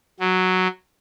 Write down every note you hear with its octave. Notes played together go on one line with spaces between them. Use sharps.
F#3